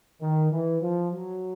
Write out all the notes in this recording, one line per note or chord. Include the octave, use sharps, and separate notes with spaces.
D#3
E3
F3
F#3